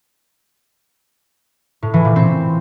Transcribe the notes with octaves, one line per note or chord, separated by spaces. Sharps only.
A2
E3
A#2
C4